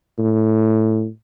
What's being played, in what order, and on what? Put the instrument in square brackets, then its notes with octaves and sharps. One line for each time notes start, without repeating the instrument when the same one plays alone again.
[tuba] A2